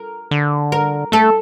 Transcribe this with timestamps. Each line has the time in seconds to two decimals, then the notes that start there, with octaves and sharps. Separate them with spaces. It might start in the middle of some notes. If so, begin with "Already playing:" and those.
Already playing: A#4
0.31 D3
0.72 A#4
1.12 A3 A4